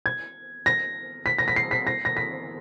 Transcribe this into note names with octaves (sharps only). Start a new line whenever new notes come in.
G#6
A#6
B6
A#6
B6
C7
B6
A#6
A#6
B6